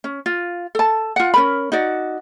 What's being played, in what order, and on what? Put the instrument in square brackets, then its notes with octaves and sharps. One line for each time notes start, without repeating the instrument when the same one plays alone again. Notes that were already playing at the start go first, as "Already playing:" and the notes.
[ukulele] C#4
F4
A4 A5
F4 F#5
C#4 A#4 B5
D#4 F#4 D5